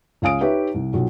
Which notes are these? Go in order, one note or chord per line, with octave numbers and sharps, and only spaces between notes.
C#2 C#4 F5 G#5 D#6 D7
D#4 G4 B4 C#5 E5
C2
B1 F3